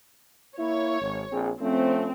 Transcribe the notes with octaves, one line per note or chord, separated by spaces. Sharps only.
A#3 E4 C#5
G#1
A#1 C4 G#4
F3 A3 C4 C#4